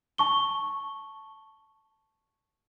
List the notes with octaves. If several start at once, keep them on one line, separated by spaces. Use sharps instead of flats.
A5 C#6 G7